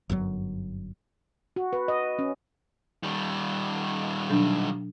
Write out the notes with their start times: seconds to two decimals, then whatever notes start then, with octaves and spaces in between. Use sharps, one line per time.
0.10 G1 F#2 A2 F#3
1.56 F#4
1.73 B4
1.88 D#5
2.19 C#4
3.03 D#3 G3
4.30 B2 F#3 D4